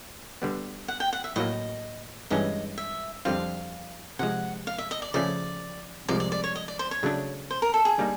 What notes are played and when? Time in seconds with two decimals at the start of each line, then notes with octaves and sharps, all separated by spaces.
0.42 D3 G3 B3
0.88 F#5
1.00 G5
1.13 F#5
1.24 E5
1.36 A2 F#3 A#3 D#5
2.30 G2 E3 G#3 C#4 D#5
2.78 E5
3.25 F2 D3 G3 C4 F4 F5
4.19 C3 F3 G#3 F#5
4.67 F5
4.78 E5
4.91 D#5
5.02 D5
5.14 C#3 F3 A3 C#4 D5
6.08 C2 C3 F3 G#3 D5
6.20 D5
6.32 D5
6.44 C#5
6.55 D#5
6.68 D5
6.79 C5
6.91 C#5
7.03 C#3 F#3 A3 D4
7.51 C5
7.62 A#4
7.74 A4
7.85 G#4
7.98 D3 G3 A#3 D#4